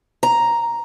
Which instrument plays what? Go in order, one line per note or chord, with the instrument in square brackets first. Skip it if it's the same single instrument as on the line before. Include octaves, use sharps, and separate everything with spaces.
[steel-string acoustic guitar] A#5